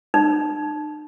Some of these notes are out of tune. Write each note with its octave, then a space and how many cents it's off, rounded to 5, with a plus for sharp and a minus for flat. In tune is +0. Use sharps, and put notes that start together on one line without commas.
D#4 -45